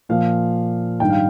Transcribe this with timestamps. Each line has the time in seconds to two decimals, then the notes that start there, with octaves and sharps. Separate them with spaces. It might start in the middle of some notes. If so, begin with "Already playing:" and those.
0.09 A#2 F3 A#3 F5
1.00 G#2 D#3 G3 D4 G5
1.10 F5